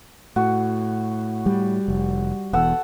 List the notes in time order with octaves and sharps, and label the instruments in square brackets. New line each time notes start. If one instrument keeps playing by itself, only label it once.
[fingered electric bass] A2 [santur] F#4
[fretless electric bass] G3
[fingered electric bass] F1
[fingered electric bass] E1 E2 [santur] A4 F#5 E6